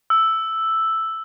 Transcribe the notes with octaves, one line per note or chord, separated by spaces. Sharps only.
E6